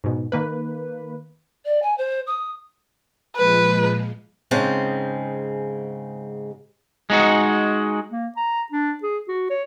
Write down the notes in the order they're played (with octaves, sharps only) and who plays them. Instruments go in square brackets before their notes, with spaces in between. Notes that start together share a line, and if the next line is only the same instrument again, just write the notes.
[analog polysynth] G#2 B2
D#3 A#3 B4
[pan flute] D5
G#5
C5
D#6
[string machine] A#2 F3 G#3 [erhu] B4
[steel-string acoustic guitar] G#2 C#3 G#3 C4 A5
[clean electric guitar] G#3 D#4 F#4
[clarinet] A#3
A#5
D4
G#4
F#4
C#5